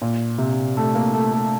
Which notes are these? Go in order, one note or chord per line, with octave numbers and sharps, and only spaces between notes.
A#2
C3
A3
A#3
A3
A3